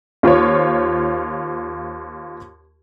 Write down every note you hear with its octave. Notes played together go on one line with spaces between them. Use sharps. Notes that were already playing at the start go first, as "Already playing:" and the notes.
D#2 F4 C5 C#5